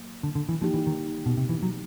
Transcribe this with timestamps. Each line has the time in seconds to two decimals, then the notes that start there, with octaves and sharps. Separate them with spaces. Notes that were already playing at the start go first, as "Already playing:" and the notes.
Already playing: F#3 A#3
0.23 D3
0.35 D3
0.49 E3
0.61 F3 A#3 D#4 G4
0.74 E3
0.87 D#3
1.26 B2
1.37 C3
1.49 E3
1.63 F#3